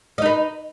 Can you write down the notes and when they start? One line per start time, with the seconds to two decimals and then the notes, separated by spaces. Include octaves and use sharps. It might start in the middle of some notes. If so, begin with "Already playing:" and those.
0.18 D#5
0.22 D#4
0.26 B4